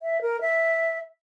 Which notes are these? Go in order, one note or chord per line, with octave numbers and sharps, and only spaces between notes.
E5
A#4
E5